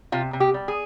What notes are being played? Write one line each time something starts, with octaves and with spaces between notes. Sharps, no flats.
C3 F4
C3
G4
G3
G#4